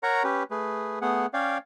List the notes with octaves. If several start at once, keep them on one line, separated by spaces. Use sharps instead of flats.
A#4 C#5 F#5 A#5 C#6
C#4 G4 B4
A3 G#4 B4
A3 B3 G#4 F#5
C#4 C#5 D5 F5 G5